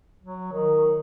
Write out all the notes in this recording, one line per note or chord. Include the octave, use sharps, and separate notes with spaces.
F#3
D#3